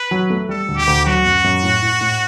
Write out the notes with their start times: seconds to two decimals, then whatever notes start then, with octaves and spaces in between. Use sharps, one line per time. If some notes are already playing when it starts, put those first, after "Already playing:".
Already playing: B4
0.11 F#3
0.30 A3
0.49 G3 A4
0.68 D2
0.77 G4
0.87 D2
1.06 F#3 F#4
1.25 F#2
1.44 F#2
1.63 A2
1.82 A2
2.01 A2